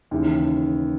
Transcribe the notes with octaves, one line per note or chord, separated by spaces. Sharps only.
D#2 C#3 E3